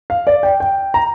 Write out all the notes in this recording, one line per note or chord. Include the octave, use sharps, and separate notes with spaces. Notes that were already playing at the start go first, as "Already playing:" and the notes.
F5
D5
G5
G5
A#5